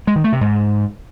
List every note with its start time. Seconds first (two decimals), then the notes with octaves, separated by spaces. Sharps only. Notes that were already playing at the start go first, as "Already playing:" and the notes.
0.07 G#3
0.16 D#3
0.24 A3
0.33 C3
0.41 G#2